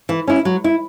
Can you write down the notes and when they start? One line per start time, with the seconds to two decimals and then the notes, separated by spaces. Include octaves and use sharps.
0.09 E3
0.28 C#4 E4
0.45 F#3
0.64 E4